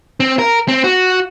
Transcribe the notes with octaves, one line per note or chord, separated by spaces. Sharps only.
C4
A#4
C4
F#4